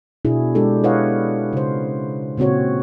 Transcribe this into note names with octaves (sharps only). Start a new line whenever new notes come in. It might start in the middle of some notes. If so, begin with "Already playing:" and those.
B2 D4 E4 F#4 G#4
G#3 D4 G4 A4
E4 B4 C#5 D#5 F5 F#5
C#3 C5
A#2 C#3 C4 F#4 C#5